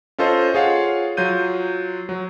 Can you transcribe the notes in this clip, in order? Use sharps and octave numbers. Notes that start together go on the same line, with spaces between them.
C#4 F4 A4 C5 D#5
F4 G#4 C#5 F5 F#5
F#3 F4 G6 D#7
F#3